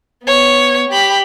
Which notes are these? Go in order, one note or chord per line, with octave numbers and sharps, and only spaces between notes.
B3 C#5
G4 B5